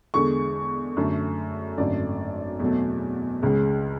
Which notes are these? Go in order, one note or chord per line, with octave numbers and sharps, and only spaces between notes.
E2 D3 G#3 C#6
F#2 D3 A3
G#1 F#2 D3 A3 D5
E2 B2 F#3 A3
C#2 C#3 G#3